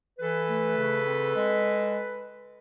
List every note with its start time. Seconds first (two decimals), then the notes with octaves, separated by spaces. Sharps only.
0.19 E3 A4 B4
0.48 A3
0.77 C#3
1.05 C4
1.33 G#3